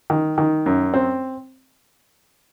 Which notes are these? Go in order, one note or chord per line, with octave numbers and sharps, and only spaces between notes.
D#3
D#3
F#2
C4